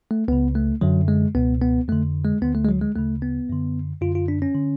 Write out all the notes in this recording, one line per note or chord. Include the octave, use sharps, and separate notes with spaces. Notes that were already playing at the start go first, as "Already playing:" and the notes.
A3
C#2 C#3 B3
A3
F#2 D3 F#3
G#3
C#2 B2 B3
B3
F2 D3 A3
G#3
D2 D3 B3
A3
G#3
F#3
G#3
D2 C#3 A3
B3
F#2 D3
F#2 D3 F4
F4
D4
C#4
D3